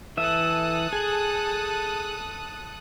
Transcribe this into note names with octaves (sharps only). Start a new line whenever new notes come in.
E3 A4 E5 D#6 F#6
G#4